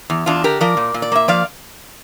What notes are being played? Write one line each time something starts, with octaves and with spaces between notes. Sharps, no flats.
E2
E2 D4 F4
D3 G4 A#4
F3 A#4 D5
A#2
A#2
D5
A#3 E5
F3 D5 F5